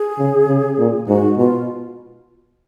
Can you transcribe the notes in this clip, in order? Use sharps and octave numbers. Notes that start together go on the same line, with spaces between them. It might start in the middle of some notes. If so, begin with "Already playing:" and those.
Already playing: G#4
C#3
C#3
A#2
G#2 F#4
B2 F4